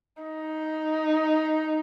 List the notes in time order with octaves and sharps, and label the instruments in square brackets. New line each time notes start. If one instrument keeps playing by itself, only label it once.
[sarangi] D#4